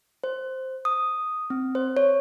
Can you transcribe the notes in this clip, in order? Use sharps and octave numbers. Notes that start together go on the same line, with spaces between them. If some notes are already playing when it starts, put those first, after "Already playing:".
C5
D#6
C4
C5
C#5